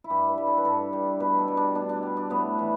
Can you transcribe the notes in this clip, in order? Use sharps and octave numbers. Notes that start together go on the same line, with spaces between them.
E4
G2 G4
B4
G3
A4
B4
G2 A4
G3
B2 B4
A4
G3
D4
B2 D4
D4
G3
D4
A2 B3
E3 G3